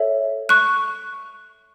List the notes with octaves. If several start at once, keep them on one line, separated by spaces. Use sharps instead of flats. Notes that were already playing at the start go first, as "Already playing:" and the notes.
Already playing: A4 C#5 E5
C#6 F#6